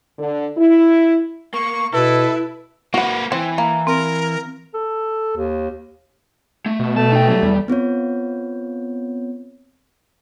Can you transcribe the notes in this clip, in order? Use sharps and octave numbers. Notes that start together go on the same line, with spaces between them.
D3
E4
A#3 C#6
B2 E4 A4 B4
A#3 F#4 B4 F#5
E3 C4
A#3
C4 A#4
A4
D#2
A3
B2
A3 A5
D#4 G5
F#3 G3
E2 G3
B3 C4 F4 C#5